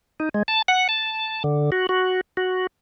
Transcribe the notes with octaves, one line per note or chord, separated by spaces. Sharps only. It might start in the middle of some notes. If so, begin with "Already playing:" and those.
D#4
G#3
A5
F#5
A5
D3
F#4
F#4
F#4